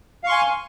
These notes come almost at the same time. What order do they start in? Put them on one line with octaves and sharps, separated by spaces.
F5 C#6 C6 G#5